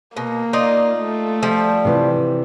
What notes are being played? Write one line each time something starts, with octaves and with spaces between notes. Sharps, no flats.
B2 A#3
D#4 F4 D5
A3
F3 G3
C3 E3